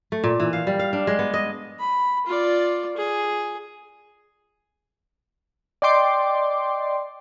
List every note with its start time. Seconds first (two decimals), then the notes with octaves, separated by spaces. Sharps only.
0.12 A3
0.24 A#2
0.40 E3
0.53 F5
0.67 G3
0.79 F5
0.93 D4
1.07 G#3
1.19 B3
1.34 D#5
1.79 B5
2.26 F4 D5
2.97 G#4
5.82 D5 D#5 G5 C6 D6